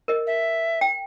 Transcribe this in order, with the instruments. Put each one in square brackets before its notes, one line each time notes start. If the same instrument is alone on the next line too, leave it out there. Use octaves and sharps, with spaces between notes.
[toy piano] A#4 D#5
[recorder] E5
[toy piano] G5